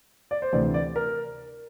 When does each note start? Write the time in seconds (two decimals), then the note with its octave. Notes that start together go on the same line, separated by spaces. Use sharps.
0.31 D5
0.42 C5
0.53 D2 C3 E3 D5
0.74 D5
0.96 A#4